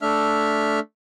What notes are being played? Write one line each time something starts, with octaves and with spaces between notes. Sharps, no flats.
A3 D4 E5 F6